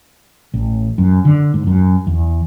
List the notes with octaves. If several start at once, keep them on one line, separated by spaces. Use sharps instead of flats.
A1
F#2
D3
G#2
F#2
E2